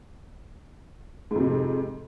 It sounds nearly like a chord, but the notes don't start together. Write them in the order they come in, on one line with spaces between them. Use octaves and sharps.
G#2 F2 C3